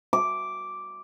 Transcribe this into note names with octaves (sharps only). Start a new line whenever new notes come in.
D6